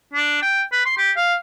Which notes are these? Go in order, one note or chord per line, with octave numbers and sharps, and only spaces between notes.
D4
G5
B4
C6
G4
F5